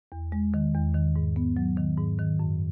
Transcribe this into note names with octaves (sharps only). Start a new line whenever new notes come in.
E2
G#3
D#3
E2
D#3
G#2
B3
F#3
D#3
G#2
D#3
F#2